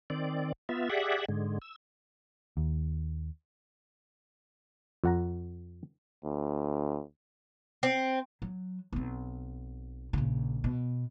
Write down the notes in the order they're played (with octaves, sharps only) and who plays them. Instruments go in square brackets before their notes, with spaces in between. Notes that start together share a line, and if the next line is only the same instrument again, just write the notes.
[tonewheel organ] D#3 C4 D5
B3 F4 E5
G4 G#4 D5 E5 F#5
G#2 D3 G#3
E6
[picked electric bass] D#2
[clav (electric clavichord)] F2 F#5 A#5
[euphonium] D2
[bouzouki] C4
[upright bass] F#3
B1 C4
A#1 C#3
B2